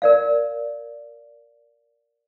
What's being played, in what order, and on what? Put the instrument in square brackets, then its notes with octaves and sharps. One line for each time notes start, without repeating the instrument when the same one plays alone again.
[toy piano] A#4 D5 F5